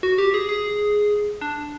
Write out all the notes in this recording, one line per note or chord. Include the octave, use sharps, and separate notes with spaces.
F#4
G4
G#4
G#4
D4